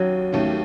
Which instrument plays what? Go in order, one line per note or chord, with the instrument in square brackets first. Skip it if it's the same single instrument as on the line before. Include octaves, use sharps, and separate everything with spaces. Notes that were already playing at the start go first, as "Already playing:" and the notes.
Already playing: [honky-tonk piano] D#2 C#4 [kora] F#3
[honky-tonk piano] D#2 D#3 A3 C#4